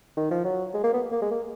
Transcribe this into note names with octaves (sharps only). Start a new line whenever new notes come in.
D#3
F3
F#3
G#3
A#3
B3
A#3
G#3
A#3